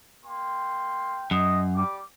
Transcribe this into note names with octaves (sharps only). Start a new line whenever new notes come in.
A#3 G5 C6
F#2 D#5
G3 D6